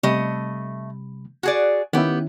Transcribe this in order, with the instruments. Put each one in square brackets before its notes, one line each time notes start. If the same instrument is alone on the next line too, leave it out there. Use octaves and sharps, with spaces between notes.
[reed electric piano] C3 G3 B5 [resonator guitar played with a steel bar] A3 D#5
[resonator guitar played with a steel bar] F#4 G#4 D5
[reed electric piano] D#3 C#4 E4 [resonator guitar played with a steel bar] B3 G4